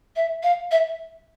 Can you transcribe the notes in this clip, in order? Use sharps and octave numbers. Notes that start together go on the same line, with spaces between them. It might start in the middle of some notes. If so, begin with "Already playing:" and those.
E5
F5
E5